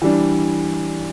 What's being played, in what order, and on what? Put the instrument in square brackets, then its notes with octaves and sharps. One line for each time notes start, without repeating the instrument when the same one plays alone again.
[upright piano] E3 G3 D4